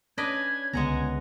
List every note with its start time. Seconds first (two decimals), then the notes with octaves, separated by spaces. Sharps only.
0.18 C#4 D4 B4 D#5 G#6
0.73 C#2 D3 G#3 B3 F#5 G#5 A#5